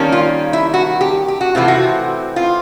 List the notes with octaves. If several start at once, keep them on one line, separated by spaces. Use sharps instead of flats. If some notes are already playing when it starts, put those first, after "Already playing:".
Already playing: D#3 G3 A#3 C#4
F4
E4
F#4
G4
G4
F#4
C3 E3 A3 C4 F4
F#4
F4